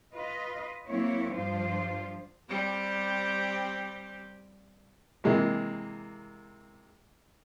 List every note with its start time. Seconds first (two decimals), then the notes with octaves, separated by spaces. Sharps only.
0.14 F4 B4 D#5
0.87 F#3 A#3 C4 E4 C#5
1.34 G2 F3 G3 F4 C5
2.49 G3 C4 G4
5.24 C3 E3 G#3 A#3